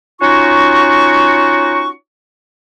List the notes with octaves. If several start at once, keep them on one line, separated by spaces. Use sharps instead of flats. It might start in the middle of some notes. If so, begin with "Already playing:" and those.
C#4 D#4 F4 F#4 C#6